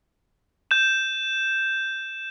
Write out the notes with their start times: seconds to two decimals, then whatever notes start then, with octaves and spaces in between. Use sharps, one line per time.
0.71 G6 E7